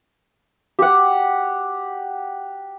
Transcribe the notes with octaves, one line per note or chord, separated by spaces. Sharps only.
G4 F#5